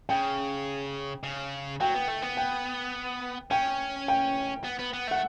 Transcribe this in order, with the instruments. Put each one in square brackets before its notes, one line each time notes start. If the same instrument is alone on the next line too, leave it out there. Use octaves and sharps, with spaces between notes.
[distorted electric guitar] C#3 [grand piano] G5
[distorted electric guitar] C#3
[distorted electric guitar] F#3 [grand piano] G5
[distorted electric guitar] B3
A3
B3
[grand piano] G5
[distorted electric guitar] C#4 [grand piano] G5
[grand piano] G5
[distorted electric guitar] B3
B3
B3
[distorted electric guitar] A3 [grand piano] F#5